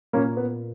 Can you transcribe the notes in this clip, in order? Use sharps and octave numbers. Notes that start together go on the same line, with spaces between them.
A#2 A#3 C#4
B3